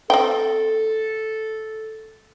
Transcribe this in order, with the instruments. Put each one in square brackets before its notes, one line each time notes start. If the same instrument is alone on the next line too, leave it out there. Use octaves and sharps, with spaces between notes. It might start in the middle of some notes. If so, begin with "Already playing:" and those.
[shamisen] C4 G5 [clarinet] A4